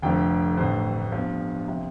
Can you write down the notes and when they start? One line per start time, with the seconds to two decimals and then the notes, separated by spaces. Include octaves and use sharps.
0.02 F1 F2 D3 F3 G5
0.57 A1 G2 D3 C5
1.12 G1 G2 F3
1.68 C3 F3